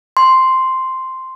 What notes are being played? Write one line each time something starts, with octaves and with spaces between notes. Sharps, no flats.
C6